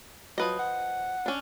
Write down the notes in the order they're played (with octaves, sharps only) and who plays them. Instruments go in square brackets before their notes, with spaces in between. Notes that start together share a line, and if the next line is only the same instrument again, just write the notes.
[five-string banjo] F3 B4 D#5 [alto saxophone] F#3
[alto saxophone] F#5
[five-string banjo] C#4 D4